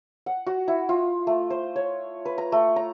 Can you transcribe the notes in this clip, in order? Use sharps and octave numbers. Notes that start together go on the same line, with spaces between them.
F#5
F#4
E4
F4
A3
C5
C#5
B4
A#5
A3
A#5